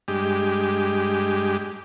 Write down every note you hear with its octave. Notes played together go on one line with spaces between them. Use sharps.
G2 G#3 G4